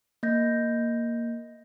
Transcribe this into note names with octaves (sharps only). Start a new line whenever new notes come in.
A#3 D#5 G6 A#6